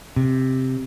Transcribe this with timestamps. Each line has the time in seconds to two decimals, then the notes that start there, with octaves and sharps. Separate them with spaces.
0.16 C3